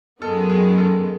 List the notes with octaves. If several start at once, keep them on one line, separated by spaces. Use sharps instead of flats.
F#2 D#3 G#3 B3 A4
G#4
A4